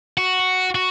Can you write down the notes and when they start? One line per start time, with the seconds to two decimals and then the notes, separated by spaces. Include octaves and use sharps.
0.17 F#4
0.75 F#4